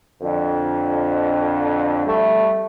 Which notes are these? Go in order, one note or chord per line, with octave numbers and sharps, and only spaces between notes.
F2 D3
G3 A3